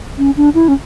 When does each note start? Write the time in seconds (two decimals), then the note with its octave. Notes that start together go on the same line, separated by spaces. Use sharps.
0.18 C#4
0.37 D4
0.55 E4
0.68 C#4